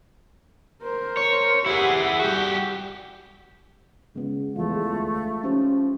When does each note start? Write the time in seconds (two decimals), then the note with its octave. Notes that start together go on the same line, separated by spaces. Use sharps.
0.83 A#4 C5
1.17 C#5
1.66 E4 G4 G#4 F#5
2.19 G3 F#4 G4
4.16 C#3 G#3 B3 F4
4.56 E2 F3 G#3 A3 F4
4.92 D2
5.44 F3 C#4 D#4 G4 C5